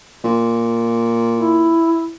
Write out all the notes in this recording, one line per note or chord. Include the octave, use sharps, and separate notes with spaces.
A#2
E4